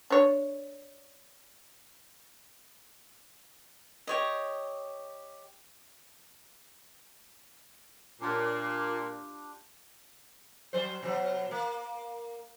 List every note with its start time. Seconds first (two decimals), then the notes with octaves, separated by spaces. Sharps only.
0.10 D4 C#5
4.07 G4 C#5 D#5
8.21 A#2 D4 F4 G4
10.73 F#3 C5
11.03 B2 F#3
11.51 A#3